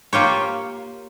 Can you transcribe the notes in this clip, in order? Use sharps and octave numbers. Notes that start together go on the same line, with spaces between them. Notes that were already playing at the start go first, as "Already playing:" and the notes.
A#3 F4 G4 C#5